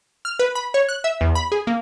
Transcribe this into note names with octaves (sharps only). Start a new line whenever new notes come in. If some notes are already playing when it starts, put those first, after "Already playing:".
F6
B4
B5
C#5
F#6
E5
E2
B5
G#4
A#3